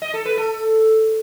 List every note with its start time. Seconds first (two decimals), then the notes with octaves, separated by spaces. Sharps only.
0.02 D#5
0.14 A4
0.26 B4
0.37 A4